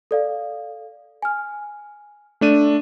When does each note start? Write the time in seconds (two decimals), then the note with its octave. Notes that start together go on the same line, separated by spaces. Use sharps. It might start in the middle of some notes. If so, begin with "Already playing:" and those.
0.11 A4 D5 F5
1.22 G#5 F6
2.41 A3 D4 D#7